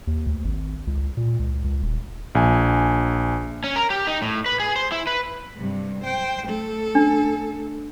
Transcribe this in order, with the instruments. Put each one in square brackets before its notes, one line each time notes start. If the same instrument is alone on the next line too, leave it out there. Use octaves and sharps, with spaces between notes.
[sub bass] D#2
D2
G#1
C#2
A#2
C#2
C#2
D#1
[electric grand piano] A#1 G#5
[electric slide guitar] C#4
A#4
G4
D#4
A2
B4
G#4
C5
E4
B4
[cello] G2 C3
C5 G5
A3 A4
[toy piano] D4